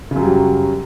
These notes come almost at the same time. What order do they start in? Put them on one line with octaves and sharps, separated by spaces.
C#3 F#2 G3 F#3